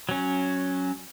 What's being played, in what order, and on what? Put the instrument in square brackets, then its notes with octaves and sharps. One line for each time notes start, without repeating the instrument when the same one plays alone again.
[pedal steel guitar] F#3 C#4